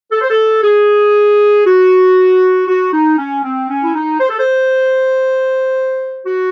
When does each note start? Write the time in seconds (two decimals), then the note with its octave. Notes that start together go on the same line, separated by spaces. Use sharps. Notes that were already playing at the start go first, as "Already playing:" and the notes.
0.11 A4
0.21 C5
0.30 A4
0.62 G#4
1.65 F#4
2.67 F#4
2.92 D#4
3.18 C#4
3.43 C4
3.69 C#4
3.83 E4
3.94 D#4
4.20 C5
4.29 A4
4.39 C5
6.25 F#4